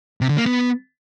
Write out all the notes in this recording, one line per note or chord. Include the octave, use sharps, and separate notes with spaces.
C3
D3
A#3
B3